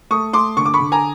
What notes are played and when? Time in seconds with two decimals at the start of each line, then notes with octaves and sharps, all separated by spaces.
0.10 A3 C#6 D#6
0.33 A3 C6 D6
0.57 D3 C#6
0.66 D6
0.74 B5 C#6
0.80 D3
0.92 G#5 A#5